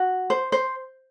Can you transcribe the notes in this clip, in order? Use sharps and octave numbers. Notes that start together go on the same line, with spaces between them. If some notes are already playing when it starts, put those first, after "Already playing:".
Already playing: F#4
C5
C5